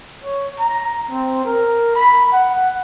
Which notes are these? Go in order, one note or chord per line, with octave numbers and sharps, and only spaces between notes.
C#5
A#5
C4
A#4
B5
F#5